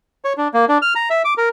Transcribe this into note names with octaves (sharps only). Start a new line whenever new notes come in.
C#5
D4
A#3
D4
F6
A#5
E5
D6
A#4